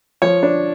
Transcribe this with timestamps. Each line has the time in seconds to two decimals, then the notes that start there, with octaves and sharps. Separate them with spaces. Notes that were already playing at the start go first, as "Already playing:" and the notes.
0.22 F3 C#5
0.43 D4